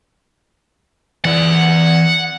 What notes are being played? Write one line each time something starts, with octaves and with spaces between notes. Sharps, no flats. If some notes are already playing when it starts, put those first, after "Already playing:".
E3 D5 F#5